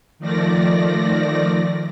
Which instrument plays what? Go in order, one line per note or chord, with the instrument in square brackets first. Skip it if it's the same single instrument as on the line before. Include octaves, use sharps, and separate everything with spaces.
[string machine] D#3 F3 A3 D5 A#6